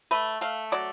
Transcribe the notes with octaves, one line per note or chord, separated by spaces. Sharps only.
A3 B4
A3 F5
F#3 D5